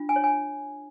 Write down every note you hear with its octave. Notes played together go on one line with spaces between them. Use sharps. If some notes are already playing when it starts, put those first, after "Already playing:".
Already playing: D4 F4
G#5
C#5
G#5